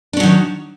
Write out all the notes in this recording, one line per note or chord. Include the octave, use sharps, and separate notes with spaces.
D#3 F#3 C#4 D4